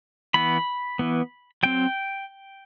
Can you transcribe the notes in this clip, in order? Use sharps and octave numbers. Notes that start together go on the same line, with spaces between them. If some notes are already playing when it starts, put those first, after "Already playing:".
E3 B3 B5
E3 B3
F#3 C4 G5